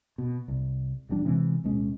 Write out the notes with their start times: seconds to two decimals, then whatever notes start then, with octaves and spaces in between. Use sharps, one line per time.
0.18 B2
0.48 C2
1.09 D#1 E2 G3 D4
1.26 C3 E3 G#3 C4
1.64 D1 B2 G#3 C#4